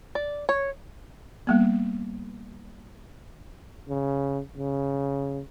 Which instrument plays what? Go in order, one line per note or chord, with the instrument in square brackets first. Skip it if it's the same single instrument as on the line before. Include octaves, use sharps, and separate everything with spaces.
[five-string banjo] D5
C#5
[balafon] G3 A#3 B3
[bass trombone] C#3
C#3